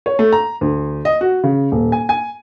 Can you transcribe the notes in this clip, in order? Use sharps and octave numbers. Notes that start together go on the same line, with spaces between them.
C#5
A3
A#5
D2
D#5
F#4
C#3
D#1
G#5
G#5